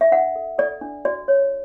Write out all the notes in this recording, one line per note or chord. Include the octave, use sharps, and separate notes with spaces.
E5
D4 F#5
A4
A4 D5
D4
F#4 D5
C#5